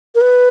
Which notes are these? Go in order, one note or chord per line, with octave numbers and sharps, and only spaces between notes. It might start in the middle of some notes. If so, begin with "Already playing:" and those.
A#4
B4